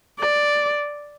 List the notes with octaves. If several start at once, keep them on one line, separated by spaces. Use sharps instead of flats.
D5